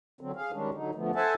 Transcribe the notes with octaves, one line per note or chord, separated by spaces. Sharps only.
D3 F#3 C4
G#4 F5
D#3 G3 G#3 C#4 D4
D3 F#3 D#4
D3 F3 A3 B3
A4 C5 E5 F#5 G#5 A5